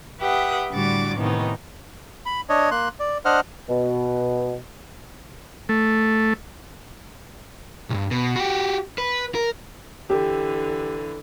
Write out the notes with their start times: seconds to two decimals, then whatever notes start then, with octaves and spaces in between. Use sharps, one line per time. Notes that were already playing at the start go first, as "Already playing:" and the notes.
0.21 G4 B4 E5 F#5 G5 D#6
0.71 A2 D3 G3 F#4 D6 A6
1.18 A2 C3 D#3 E3 B3 D#4
2.26 B5
2.49 D4 C#5 D#5
2.71 A#3 C6 F#6
3.00 D5
3.25 D4 C5 D#5 F#5 F6
3.69 B2
5.69 A3
7.90 B1 G2
8.11 B2
8.36 F#4 G4
8.98 B4
9.35 A#4
10.10 D3 E3 G4